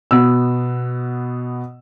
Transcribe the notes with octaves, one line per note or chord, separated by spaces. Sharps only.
B2 B3 E6